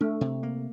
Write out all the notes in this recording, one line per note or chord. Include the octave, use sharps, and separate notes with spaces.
A3 D4
C3
A#3